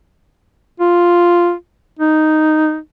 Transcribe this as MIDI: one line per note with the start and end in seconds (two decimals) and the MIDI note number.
0.80 1.53 65
1.99 2.78 63